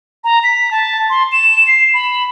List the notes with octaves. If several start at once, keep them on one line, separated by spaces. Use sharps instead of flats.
A#5
B6
A5
C6
E7
C7
B5